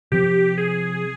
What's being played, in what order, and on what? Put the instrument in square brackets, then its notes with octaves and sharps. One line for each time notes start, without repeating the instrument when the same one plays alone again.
[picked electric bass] C3 F3 C4 [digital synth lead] G4
[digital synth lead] G#4